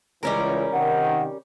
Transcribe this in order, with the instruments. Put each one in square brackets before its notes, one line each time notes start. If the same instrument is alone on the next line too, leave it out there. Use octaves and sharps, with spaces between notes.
[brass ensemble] C#2 E3 [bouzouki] G3 C#4 A#4
[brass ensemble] C3 D#3 [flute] F#5